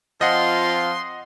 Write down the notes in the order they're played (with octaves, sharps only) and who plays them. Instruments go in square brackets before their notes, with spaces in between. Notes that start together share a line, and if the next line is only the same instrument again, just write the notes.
[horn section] F3 C4 F4 [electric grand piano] D#5 F#5 [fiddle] C6